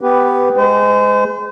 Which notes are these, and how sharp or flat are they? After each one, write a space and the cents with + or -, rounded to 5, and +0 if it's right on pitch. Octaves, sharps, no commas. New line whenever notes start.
B3 +10 G4 +0 B4 +0
G#3 +0 C5 -40